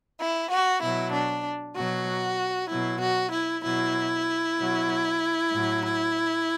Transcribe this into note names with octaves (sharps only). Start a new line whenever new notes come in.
E4
F#4
B2 F#3 E4
D4
B2 F#3 F#4
B2 F#3 E4
F#4
E4
B2 F#3 E4
B2 F#3
A2 F#3